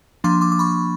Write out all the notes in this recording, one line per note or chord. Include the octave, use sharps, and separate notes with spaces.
F3 A#3 D4 C6 D6
C6 D6
D6
B5 C#6